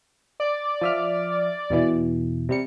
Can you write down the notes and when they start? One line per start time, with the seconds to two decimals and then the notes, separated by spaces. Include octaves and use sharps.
0.40 D5
0.81 F3 E5 F6
1.70 E2 B2 E3
2.49 C3 G3 C#7